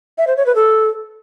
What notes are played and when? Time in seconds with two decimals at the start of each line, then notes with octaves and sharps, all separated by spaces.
0.18 E5
0.27 C5
0.37 C#5
0.46 B4
0.55 A4